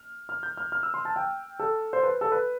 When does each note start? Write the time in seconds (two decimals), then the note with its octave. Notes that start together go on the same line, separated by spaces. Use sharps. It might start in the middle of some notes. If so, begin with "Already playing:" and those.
Already playing: F6
0.29 F6
0.43 G6
0.57 F6
0.72 F6
0.83 E6
0.94 C6
1.05 A5
1.16 G5
1.60 A4
1.93 C5
2.03 B4
2.21 A4
2.32 B4